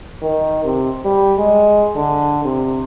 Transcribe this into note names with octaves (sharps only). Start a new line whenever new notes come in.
D#3
C3
G3
G#3
D3
C3